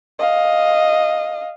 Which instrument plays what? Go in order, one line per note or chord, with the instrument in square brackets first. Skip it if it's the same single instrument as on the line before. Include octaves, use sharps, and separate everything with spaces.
[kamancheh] D#5 F5